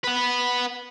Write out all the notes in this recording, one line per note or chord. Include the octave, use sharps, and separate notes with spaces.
B4 F#5